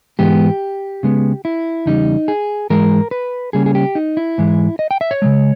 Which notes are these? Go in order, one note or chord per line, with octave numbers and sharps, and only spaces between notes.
G#2 E3 G#3 B3 G4
C#3 G#3 B3
E4
E2 C#3 G3 D#4
G#4
G#2 E3 G#3 A#4
B4
C#3 G3 A#3 C#4 G#4
G#4
G4
D#4
E4
G#2 E3 G#3
D#5
G5
E5
C#5
C#3 E3 G#3